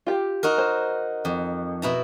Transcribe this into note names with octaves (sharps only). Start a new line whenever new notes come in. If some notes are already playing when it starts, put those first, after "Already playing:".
F4 G4
D#4 F#4 A#4
C5
F2
B2 E4 A#5